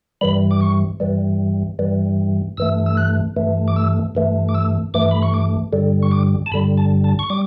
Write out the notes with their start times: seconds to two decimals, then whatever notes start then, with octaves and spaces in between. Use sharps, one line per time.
0.21 G2 E3 G3 B5
0.51 D6
0.61 C#6
1.00 G2 E3 G3
1.79 G2 E3 G3
2.57 G2 E3 A3 E6
2.86 E6
2.97 F#6
3.36 G2 E3 A3
3.68 D6
3.76 E6
4.15 G2 E3 A3
4.49 D6
4.55 E6
4.94 G2 E3 A3 D6
5.11 B5
5.23 C#6
5.34 D6
5.73 G2 D3 G3
6.03 C#6
6.11 D6
6.46 A5
6.52 G2 D3 G3 B5
6.77 A5
7.04 A5
7.19 C#6
7.30 G3 D6